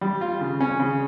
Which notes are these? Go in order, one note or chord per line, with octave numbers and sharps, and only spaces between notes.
G3
F4
C#3
C#4
C#3